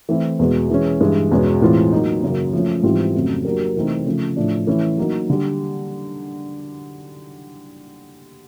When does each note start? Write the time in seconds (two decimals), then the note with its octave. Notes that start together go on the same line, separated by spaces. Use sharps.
0.09 E3 A3 C4 E4
0.39 E2 B2 G#3
0.70 E3 G#3 C#4
1.01 G2 E3 G#3
1.31 E2 B2 G#3 C#4
1.62 A2 E3 G#3 C4 F4
1.93 F#3 A#3 D#4
2.23 F#2 C#3 F#3 A#3
2.53 F3 A3 C#4
2.83 G#2 E3 G3 C4 F4
3.14 F2 C#3 F#3 A3
3.45 F#3 A#3 D4 G4 A#4
3.76 C3 E3 A3 C4 D#4
4.05 C#3 F3 A3
4.37 A2 F3 A3 D4
4.67 E3 A3 C#4 E4
4.98 F#3 A#3 D#4
5.30 D3 G3